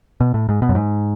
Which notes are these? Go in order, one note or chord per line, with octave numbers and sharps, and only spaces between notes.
B2
A2
G#2
B2
F#2
G#2